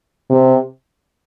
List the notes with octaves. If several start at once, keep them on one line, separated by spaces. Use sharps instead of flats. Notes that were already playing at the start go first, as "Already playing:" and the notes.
C3